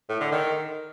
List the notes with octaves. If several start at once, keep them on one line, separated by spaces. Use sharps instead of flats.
A2
D3
D#3